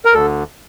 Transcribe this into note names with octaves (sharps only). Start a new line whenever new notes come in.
A#4
D2 D3 A4